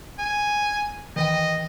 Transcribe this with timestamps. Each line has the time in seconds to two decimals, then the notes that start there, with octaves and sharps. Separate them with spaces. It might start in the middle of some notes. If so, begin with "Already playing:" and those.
0.19 G#5
1.16 D#3 E3 D#5 G5